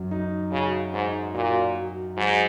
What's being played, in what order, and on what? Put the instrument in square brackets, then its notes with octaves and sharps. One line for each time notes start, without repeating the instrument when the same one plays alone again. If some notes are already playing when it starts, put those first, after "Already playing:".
Already playing: [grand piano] F#2
D#4
[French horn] C#3 [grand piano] F#4
[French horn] G#2 [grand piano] D#4
[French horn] A#2 [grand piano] F#4
[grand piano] F#4
[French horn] G#2 [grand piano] F#3